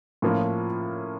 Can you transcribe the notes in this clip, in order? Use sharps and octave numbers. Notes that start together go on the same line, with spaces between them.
A2 F3 A#3 C#4 F4